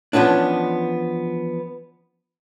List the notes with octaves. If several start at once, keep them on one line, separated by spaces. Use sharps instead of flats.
E3 F3 B3 C#4 D4